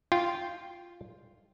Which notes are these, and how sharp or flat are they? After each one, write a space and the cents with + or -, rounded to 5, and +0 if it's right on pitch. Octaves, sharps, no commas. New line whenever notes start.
F4 -5 G5 +0